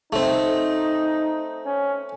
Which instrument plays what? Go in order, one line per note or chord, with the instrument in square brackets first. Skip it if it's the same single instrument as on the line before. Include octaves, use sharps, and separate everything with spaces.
[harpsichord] A3 C4 [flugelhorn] D#4
[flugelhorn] C#4